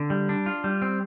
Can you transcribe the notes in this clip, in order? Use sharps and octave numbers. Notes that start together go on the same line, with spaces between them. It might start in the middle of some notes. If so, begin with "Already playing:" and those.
Already playing: D3
G3
D4
F4
G3
C4